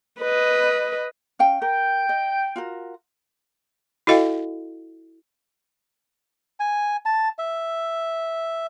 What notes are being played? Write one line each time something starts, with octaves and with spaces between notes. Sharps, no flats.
B4 D#5
C#4 F5 G5
A#4 G5
D#5
F4 F#4 A#4
E4 F#4 A4 D#5 F5 G5
G#5
A5
E5